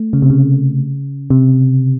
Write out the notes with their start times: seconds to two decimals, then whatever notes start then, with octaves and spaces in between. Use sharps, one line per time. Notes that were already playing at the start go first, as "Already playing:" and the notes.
Already playing: A3
0.13 C#3
0.22 C3
0.30 C#3
1.30 C3